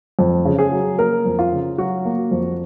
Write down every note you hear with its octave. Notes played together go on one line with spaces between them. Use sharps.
F2
C#3
G#4
F#3
A#3 A#4
F2
F4
C#3
F#3 F#4
A#3
F2